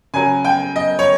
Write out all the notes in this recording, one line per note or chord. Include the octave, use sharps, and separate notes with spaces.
C#3 F#3 G#5
G5
D#5
C#5